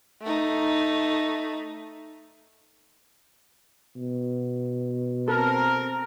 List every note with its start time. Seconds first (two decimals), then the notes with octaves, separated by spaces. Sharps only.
0.22 A3 D#4
3.96 B2
5.28 C4 A4 A#4